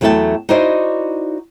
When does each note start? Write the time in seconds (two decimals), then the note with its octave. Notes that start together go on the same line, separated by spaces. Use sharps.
0.01 E2 F#3 A3 E4 G5 A5
0.49 D#4 E4 F#4 C5 D5 D#5